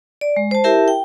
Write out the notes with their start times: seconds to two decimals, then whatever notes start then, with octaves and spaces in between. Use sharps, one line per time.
0.21 D5
0.36 G#3
0.51 C5 A5
0.64 E4 G4 A#4 E5 A5
0.88 G5